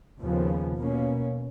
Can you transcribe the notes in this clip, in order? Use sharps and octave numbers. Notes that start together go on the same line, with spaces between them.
D#2 C#3 F3 B3
B2 A#3 C#4